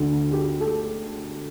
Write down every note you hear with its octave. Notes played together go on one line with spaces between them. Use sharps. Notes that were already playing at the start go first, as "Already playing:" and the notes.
Already playing: D2 D3
G4
A4